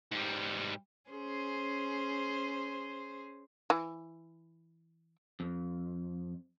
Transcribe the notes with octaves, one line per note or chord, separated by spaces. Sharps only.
G#2 G3
C#4 G#4 C5
E3
F2